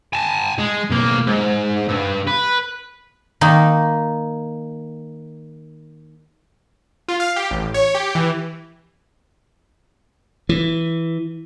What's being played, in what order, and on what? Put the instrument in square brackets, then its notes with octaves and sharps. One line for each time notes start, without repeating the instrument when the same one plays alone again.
[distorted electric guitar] G#5 A5
G#3
B1 A#3
G#2
G2
B4
[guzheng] D#3 A#3 D#4
[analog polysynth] F4
F5
G4
A1
C#5
G4
E3
[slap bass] E3